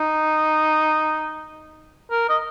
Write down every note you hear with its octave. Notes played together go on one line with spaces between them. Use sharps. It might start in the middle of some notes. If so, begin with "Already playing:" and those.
Already playing: D#4
A#4
D#5